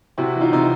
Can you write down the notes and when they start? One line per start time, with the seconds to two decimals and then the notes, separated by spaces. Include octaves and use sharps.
0.18 C3 E4 F#4
0.35 E3
0.41 D#4 F4
0.52 C3 D#4